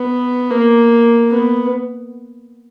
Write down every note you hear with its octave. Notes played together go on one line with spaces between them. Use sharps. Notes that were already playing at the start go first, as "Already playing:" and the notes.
Already playing: B3
A#3
B3